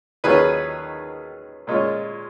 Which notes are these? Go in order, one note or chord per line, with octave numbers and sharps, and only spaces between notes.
D#2 D#3 F#3 C#4 F4 G#4 B4
A#2 G#3 C#4 F4